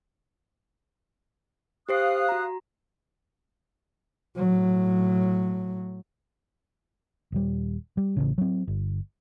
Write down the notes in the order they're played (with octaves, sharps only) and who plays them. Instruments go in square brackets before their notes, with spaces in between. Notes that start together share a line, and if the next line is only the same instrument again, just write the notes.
[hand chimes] G4 C5 C7 [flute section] F5 D#6 F#6
[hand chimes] F#4 A#5
[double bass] A2 F#3
[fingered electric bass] D#1 G3
G3
A1 A2 C#3
F#3 C4
G1